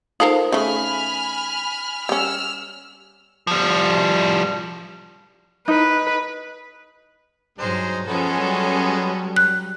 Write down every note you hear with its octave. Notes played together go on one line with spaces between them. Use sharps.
D#4 F4 A4 A#4 C5
C#3 A3 G#5 B5 F6
G3 C#4 E6 F6
F3 G3
D#4 B4
G2 F#3 G#3 D#4 C5
F3 G#3 B3 C#4 A4
F#3 G3
F#6